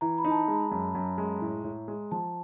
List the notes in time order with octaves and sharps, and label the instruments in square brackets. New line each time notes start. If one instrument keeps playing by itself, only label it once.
[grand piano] E3 [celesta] A#5
[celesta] B5
[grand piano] D#4
[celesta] A5
A#5
[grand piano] G#3
[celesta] A#5
[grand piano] F#2
F#2
G#3
A2
A2
G#3
[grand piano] F3 [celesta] A5